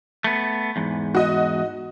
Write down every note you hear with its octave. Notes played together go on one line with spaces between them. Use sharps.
A3 B3
E2 G#2
F#4 D#5